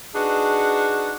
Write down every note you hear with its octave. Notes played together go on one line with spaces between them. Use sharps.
D4 D#4 F#4 G#4 B4